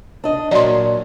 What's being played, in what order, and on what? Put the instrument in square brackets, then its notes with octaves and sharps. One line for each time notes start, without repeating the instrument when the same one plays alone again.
[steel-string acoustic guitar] D4 D#5
[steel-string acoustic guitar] A#2 F#3 [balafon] D5 C6